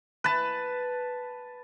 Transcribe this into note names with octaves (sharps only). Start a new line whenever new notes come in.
B4 A5